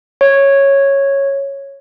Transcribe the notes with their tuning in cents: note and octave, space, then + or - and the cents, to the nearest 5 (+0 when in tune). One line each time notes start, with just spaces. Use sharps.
C#5 -5